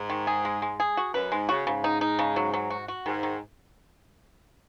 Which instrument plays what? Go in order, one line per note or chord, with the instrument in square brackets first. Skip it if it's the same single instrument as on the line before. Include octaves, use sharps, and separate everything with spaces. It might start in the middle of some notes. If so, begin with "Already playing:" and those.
Already playing: [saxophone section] G#2
[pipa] D#3
G#4
G#3
G#3
G#4
F#4
[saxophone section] F#2 [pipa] B4
[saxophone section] G#2 [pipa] G#3
[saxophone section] C#3 [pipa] F#4
[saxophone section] G#2 [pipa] C#3
[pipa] D#4
D#4
C#3
F#3
F#3
F#4
F#4
[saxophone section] G#2 [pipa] D#3
[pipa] D#3